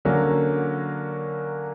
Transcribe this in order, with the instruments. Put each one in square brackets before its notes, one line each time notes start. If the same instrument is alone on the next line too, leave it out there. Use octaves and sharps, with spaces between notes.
[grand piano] D3 F#3 A#3 C#4